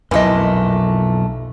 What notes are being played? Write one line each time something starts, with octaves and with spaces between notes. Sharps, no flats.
B1 F2 A#2 E3 A3 D#5